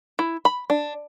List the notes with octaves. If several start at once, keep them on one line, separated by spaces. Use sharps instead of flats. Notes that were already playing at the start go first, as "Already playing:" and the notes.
E4
B5
D4